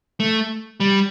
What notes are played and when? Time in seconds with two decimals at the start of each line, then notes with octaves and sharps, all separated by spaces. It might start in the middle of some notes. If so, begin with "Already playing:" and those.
0.20 A3
0.80 G3